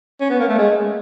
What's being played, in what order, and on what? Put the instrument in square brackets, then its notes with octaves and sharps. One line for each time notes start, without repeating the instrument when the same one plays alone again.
[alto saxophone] C#4
B3
A#3
A3
G#3